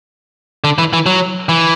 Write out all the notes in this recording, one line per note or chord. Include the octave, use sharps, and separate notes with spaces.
D3
E3
E3
F#3
E3